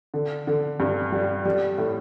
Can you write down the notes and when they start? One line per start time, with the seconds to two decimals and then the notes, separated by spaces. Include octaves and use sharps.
0.14 D3
0.47 D3
0.80 G2
1.12 G3
1.45 G3
1.78 A2